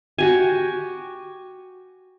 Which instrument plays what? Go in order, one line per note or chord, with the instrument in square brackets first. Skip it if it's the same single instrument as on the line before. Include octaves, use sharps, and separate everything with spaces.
[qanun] F#4 G4 G#5